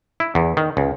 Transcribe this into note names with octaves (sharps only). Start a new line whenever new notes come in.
E4
E2
D#3
C#2